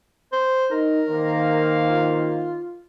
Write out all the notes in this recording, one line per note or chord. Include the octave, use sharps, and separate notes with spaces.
C5
D#4 A#4
D#3 A#3 C5 F5
F4